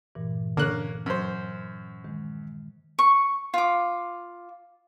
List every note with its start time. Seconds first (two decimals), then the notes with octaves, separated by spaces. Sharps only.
0.15 G2 A#2 E3
0.57 D3 A#3 C#4 F#6
1.06 F#2 C5
2.04 D#3 G#3
2.99 C#6
3.54 F4 D6